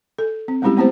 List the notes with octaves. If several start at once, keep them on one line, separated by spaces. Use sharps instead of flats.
A4
C4
G3 G#3 C4 C#4 E4 G4
A3 B3 C4 E4 G4 C5